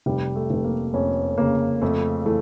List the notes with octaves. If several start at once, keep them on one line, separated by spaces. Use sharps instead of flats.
F1 G3
A3
F1
A#3
F2 C#4
C#3 A#3
F2 A3
E3 A3